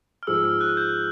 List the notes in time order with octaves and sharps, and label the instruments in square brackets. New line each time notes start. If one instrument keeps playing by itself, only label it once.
[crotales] F6
[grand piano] G#2 F3 G#3 [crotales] E6
[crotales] F6
F#6
G6